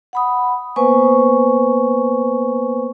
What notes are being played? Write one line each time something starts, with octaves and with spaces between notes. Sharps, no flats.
F#5 B5 D#6
A#3 B3 B4 C5 G#5 C#6